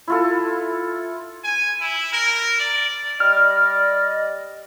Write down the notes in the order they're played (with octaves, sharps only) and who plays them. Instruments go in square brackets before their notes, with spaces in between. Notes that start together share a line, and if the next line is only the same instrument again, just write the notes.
[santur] E4 F4 A4
[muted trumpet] G#5
E4
A#4
D5
[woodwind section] G3 D5 D#5 [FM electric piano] F6